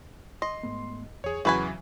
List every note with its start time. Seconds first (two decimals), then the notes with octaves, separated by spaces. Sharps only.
0.42 D#5 C6
0.63 G#2 A3 B3
1.24 E2 G#4 C#5
1.45 E2 C#3 E3 F#3 F#4 B4 G#5